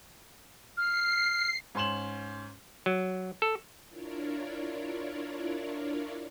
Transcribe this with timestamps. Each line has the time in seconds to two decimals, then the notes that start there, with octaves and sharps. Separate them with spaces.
0.77 F6 C7
1.75 G#2 C#4 C6 E7 F#7
2.86 F#3
3.42 A4
3.89 D4 E4 F4 A#4 C#5 D5